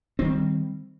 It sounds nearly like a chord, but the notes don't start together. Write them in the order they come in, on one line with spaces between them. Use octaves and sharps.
C4 D#3 G3